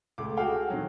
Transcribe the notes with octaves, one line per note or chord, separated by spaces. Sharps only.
C#2 A3 D6
F#4 G#4 A4 F5 G5
D#3 F#3